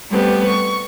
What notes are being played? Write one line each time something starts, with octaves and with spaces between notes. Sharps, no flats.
G3 A3 B3 C4 G4
C#6